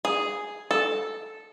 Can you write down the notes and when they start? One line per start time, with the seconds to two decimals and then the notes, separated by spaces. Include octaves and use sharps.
0.05 G#4
0.71 A4